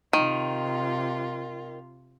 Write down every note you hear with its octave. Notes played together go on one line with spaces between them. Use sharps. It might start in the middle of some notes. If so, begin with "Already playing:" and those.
C3 D#3 F4